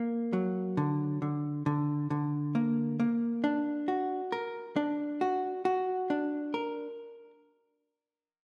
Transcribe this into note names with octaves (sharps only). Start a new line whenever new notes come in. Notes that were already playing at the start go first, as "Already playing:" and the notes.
Already playing: A#3
F#3
D3
D3
D3
D3
A#3
A#3
D4
F#4
A#4
D4
F#4
F#4
D4
A#4